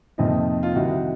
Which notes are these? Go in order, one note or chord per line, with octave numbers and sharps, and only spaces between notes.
F2 C3 F3 A#3 D#4
F4
C2 C3 D#3 D#4 F#4